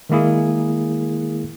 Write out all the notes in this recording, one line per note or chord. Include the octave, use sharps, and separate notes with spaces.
D#3 G#3 A#3 E4 G#4